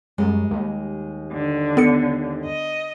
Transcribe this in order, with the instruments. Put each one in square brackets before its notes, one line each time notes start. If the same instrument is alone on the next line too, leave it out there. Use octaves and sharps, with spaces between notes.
[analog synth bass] F#2 [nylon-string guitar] G3 G#3
[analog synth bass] D#2
[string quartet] D3
[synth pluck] B3 A4 C#7
[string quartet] D#5